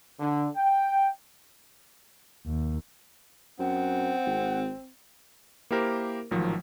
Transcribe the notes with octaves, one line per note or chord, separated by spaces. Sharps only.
D3
G5
D#2
F#2 C4 F#5
G#1
A#3 E4 G4 A#4 C5
A1 G#2 D#3 F3 F#3